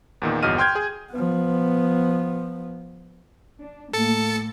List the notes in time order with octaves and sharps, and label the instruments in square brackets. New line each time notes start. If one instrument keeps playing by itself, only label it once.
[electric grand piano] E2 A#2 D#3
G1 E2 F#4 D#5 F6 D#7
G5 C6 F6 G6 G#6
G#4
[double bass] F3 B3
[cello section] D4
[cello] A2 [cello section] A#3 [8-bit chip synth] A4 A6 C#7